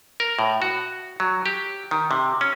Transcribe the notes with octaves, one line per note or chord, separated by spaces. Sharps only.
A#4
A2
F#4
F#3
G4
D#3
C3
C#4